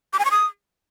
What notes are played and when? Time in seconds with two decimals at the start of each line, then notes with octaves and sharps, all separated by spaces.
0.13 D6
0.19 G#5
0.25 C#6
0.31 D#6